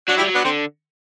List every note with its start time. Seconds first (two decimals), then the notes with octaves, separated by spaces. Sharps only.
0.08 F#3 D4 F#4
0.17 E4 G4
0.20 G3
0.26 F#3
0.35 B3 D4
0.44 D3 C4